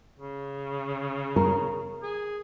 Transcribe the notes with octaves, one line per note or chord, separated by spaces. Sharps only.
C#3
A#4
G#4